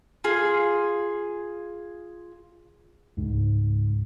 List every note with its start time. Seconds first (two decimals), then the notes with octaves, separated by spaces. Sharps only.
0.24 F4 G#4
3.17 C#2 G#2